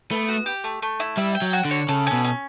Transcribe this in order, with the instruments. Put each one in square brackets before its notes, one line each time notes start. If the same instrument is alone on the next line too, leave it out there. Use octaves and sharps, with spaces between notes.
[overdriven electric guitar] A3 [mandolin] B3
[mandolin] F#4
G4
A3
A3
E4
[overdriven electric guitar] G3 [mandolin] E5
[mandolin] G5
[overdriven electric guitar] F#3
[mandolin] F#4
[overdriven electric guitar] D3
[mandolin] C#5
[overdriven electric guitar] C#3 [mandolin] A4
[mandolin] C#4
[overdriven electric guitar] B2
[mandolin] C#4